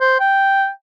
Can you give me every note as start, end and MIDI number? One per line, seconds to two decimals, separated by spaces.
0.01 0.16 72
0.20 0.69 79